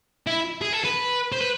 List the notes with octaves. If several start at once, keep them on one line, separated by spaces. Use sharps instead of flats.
E4
G#4
A4
B4
C5
B4